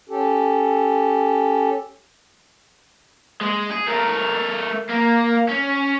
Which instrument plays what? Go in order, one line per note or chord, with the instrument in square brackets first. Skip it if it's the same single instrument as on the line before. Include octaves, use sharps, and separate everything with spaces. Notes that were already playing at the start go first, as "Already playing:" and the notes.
[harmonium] C#4 G4 A4
[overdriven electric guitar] G#3
G#4
A3 A#4
A#3
C#4